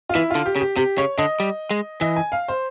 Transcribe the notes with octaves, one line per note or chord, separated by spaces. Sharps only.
F4
E3 E4
D3 F4
G4
C#3
G4
C3 G4
C#3 C#5
D3 D#5
G3
G#3
E3 D#5
G#5
F5
C5